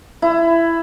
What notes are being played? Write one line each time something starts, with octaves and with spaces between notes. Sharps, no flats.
E4